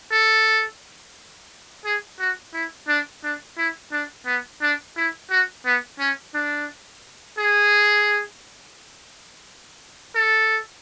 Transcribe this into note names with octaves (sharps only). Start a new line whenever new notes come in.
A4
G#4
F#4
E4
D4
D4
E4
D4
B3
D4
E4
F#4
B3
C#4
D4
G#4
A4